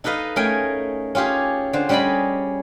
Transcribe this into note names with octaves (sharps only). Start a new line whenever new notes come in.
D#4 A4 B4 D#5 F5
A3 C#4 G#4 A#4 G5 G#5
C#4 F4 G4 G#4
D3 C5
G3 C#4 G#4 D5 D#5 B5